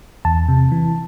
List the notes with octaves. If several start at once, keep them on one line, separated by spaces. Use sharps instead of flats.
E2 A5
C3
E3